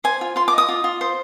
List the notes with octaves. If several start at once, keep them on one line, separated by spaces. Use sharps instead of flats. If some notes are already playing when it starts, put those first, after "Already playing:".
C5 G#5
F4
F4 C6
D6
D#5
D#6
F4
F4
C5